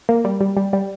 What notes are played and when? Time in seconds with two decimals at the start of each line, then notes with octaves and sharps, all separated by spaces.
0.09 A#3
0.25 G3
0.40 G3
0.57 G3
0.73 G3